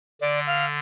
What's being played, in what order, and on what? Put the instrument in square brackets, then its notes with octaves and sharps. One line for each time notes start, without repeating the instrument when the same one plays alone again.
[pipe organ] D3 [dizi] D5
[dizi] F5